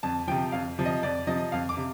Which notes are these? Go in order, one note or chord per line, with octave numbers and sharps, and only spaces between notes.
F2 A5
C3 F3 G5
F2 F5
C3 F3
D#5
F2 D5
C3 F3 D#5
F2 F5
D6
C3